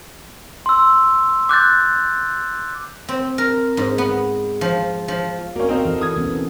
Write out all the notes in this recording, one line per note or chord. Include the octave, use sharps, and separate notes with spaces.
C6 E6
D6 F#6 G6 A6
C4
A#4
G#2
B3
F3
F3
A#3 C#4 F#4
C4 D#4 A#4 F5
E3 A4
D#6 G#6
E3 B3 C#4
C4